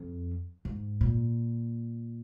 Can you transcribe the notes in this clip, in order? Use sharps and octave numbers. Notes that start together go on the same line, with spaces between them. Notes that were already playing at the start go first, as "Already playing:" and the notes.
Already playing: F2
G#2
A#2